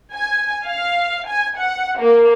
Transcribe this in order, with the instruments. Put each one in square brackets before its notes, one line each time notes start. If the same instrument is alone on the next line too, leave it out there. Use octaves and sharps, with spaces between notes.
[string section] G#5
F5
G#5
F#5
A#3